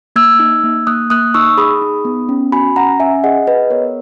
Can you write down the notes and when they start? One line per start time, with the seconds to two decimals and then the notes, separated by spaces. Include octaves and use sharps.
0.16 A#3 E6 G#6
0.40 D#4
0.64 A#3
0.87 A#3 D#6 F#6
1.10 A#3 D#6 F#6
1.34 D#4 C#6 E6
1.57 G#4 B5 D#6
1.82 D#4
2.05 B3
2.29 C#4
2.52 F#4 G#5 B5
2.76 C#4 F#5 A#5
3.00 C#4 E5 G#5
3.24 G#4 D#5 F#5
3.47 G#4 B4 D#5
3.70 B3 A#4 C#5